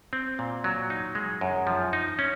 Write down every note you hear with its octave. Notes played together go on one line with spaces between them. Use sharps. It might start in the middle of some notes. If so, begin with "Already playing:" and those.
C4
A#2
F#3
D#4
G#3
F#2
F3
D#4
C#4